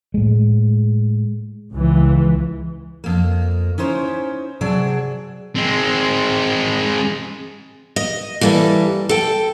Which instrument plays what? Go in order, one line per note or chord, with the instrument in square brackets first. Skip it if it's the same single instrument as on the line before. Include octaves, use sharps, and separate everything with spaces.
[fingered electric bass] A2 G#3
[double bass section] C#2 E3
[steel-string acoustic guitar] F2 A#3
C#4 D#4 E4 C5 C#5
C3 F#3 G#4 D5 A5
[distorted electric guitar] G#3 C4
[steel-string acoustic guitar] D#5
E3 G3 A#3 A4 B4
A4 G5